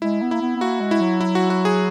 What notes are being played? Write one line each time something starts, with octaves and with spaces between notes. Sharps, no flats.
G#3 E4
B3
A#3 E4
B3
B3
A#3 F#4
G#3
E4
F#3
E4
F#4
F#4
G#4